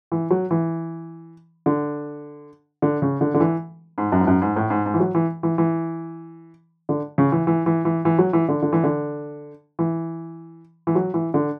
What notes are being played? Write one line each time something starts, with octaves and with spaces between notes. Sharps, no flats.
E3
F#3
E3
D3
D3
C#3
D3
D3
E3
G#2
F#2
G#2
F#2
G#2
A2
G#2
G#2
E3
F#3
E3
E3
E3
D3
C#3
E3
E3
E3
E3
E3
F#3
E3
D3
D3
E3
D3
E3
E3
F#3
E3
D3